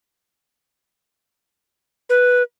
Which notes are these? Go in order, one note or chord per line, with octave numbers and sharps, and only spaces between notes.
B4